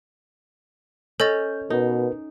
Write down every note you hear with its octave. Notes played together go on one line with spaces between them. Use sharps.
C#4 A4 D#5 G6 A6
B2 D#4 A#4 B4